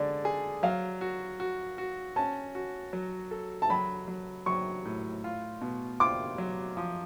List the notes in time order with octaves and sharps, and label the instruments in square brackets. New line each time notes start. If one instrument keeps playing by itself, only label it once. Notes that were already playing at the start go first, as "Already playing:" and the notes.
Already playing: [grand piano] D3 G#3 [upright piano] D5
[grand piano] G#4
[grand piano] F#3 [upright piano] F5
[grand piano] F#4
F#4
F#4
[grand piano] C#4 [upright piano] A5
[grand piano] F#4
F#3
A4
[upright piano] A5
[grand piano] F#3 [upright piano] B5
[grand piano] F#3
[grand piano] F#3 [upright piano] C#6
[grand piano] A2
F4
B2
[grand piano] F4 [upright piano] D6
[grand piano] F#3
F3